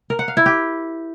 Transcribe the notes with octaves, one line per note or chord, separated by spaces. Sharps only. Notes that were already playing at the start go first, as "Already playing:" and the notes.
A#4
F#5
F5
E4
G4